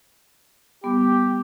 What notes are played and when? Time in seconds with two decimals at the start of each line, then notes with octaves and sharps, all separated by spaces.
0.84 G3 B3 G4